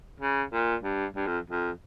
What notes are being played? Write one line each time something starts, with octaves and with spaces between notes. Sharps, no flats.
C#3
A#2
G2
G2
F2
F2